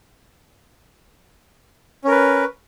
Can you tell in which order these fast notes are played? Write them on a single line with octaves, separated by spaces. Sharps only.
C#4 A#4 B4